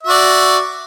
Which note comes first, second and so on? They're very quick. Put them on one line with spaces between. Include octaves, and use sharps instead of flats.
E5 F#4 D5